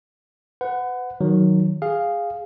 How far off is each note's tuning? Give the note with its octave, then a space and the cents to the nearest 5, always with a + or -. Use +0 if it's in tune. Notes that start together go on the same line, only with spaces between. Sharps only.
B4 +35 F#5 -5
D#3 +0 F#3 +0
G#4 -10 F5 +0